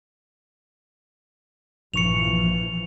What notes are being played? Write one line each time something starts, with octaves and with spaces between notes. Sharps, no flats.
A#1 G2 A#2 E3 F3 C#6 C#7 F7